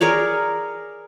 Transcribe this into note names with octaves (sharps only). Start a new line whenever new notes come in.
G#4 A#4 C#5 D5